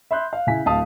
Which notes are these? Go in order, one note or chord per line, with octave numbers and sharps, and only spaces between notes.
E5 B5 C6 F#6 G6
F5
C#3 E4 G#5 B6
D1 F5 A5 D#6